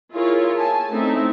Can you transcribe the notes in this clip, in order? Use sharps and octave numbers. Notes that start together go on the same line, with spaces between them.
E4 F4 G#4 A#4 C#5
G#5 A5
A3 C4 C#4 D#4 E4 E5